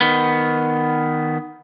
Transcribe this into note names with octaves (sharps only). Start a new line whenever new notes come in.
D#3 B3